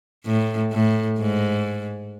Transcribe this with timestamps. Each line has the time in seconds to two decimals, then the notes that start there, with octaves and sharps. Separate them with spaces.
0.25 A2
0.73 A2
1.19 G#2